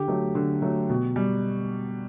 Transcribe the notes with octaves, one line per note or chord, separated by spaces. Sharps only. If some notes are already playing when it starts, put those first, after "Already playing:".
Already playing: D3 G4
F#3 A3
D3
F#3 A3
B2
G3